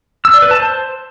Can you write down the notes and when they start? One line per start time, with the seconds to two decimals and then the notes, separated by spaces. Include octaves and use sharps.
0.25 E6
0.34 D5
0.42 B4
0.51 A5
0.60 C5